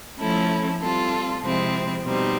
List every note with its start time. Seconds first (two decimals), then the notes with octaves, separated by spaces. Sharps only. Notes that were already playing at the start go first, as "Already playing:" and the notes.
0.18 F3 A3 C#4 E4 A4
0.80 G3 C4 F4 A4
1.40 C3 F3 G#3 C4 E4
2.02 B2 G3 C4 D#4